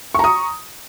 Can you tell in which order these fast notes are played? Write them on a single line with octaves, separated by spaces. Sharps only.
C#6 A#5 D#6